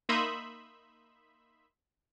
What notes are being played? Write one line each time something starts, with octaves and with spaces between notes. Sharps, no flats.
A#3 D#4 E5 B5 C6 D#6